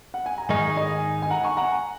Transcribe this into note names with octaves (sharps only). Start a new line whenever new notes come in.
F#5
G#5
A#5
G#2 D#3 G#3 D#4 G#5 C#6
D#5 G#5
G#5
F#5 A#5
G#5 C#6
F#5 A#5